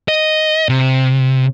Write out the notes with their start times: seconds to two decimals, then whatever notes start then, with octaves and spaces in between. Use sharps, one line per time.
0.08 D#5
0.69 C3